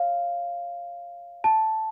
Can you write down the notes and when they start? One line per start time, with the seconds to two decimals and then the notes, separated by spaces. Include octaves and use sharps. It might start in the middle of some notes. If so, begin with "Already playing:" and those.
Already playing: C#5 F5
1.44 A5